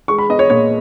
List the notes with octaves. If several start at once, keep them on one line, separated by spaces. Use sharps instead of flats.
G#3 C#6
B5
B3 D#5
C#5
A#2 C#5